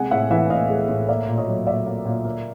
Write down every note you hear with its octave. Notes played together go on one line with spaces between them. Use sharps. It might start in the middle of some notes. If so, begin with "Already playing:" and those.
Already playing: C3 G#3 F#5 G#5
A2 E5 F#5
E3 E5 F#5
A2 D#5 F5
G#3
A2
A#3 D5 E5
A#2
C#5 D#5
F#3
A#2 D5 E5
A#3
A#2
A#3